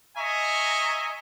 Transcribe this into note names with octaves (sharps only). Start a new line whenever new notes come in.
D#5 E5 G#5 A#5 C#6